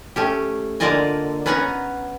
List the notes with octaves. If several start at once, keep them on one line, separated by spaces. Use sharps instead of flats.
A3 C#4 G4
D3 A#3 F4 D5 D#5 G#5
B3 C#4 B4 F#5 G#5 A#5